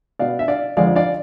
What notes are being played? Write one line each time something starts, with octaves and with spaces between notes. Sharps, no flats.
B2 B3 D5 F5
E5
D5 F5
F2 D3 F3 G#3 D5 F5
D5 F5